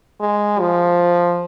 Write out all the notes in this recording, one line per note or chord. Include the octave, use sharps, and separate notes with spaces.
G#3
F3